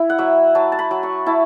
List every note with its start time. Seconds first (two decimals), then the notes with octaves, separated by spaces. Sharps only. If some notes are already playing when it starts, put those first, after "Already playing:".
Already playing: E4
0.10 F#5
0.18 F#3 E5
0.55 F#3 A5
0.72 A5
0.79 B5
0.91 F#3
1.03 C#6
1.26 E4 A5